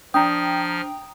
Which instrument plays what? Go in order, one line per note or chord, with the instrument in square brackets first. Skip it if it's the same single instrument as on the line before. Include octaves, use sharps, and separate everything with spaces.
[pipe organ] F3 F6 [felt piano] D4 [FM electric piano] G5 A#5 [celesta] D#6